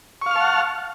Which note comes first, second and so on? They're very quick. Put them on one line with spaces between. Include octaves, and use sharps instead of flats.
C#6 F5 F6 A5 F#5